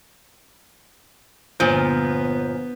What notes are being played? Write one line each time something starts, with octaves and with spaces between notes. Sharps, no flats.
G1 A#2 F3 B3 C5 G#5 G6